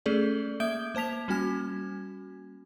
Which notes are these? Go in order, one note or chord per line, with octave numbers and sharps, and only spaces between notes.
A3 C#4 G#4 A4 D5
A#3 E5 D#6 G6 D7 G7
A#3 C5 A5 B6 F7
G3 A#3 C#4 F#4 G#5 G#6